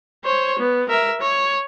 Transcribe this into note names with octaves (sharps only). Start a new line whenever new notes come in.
C5 C#5
B3
A#4 E5
C#5